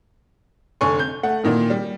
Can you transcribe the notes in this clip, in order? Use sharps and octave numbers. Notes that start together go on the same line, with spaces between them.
F1 D3 G#5 C#6
G6
A3 F#5
A#2 D#3 E3
G3